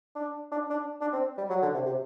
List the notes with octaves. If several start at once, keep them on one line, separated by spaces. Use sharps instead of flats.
D4
D4
D4
D4
C4
G3
F#3
D3
C3
C3